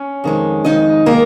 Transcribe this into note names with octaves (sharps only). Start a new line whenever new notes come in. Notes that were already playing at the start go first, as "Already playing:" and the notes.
Already playing: C#4
F2 D#3 G#3
F2 D#3 G#3 D#4 D#5
D#3 G#3 A#3 A#4